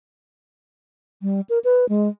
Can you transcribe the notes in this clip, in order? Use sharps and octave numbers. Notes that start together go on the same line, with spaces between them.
G3
A#4
B4
G#3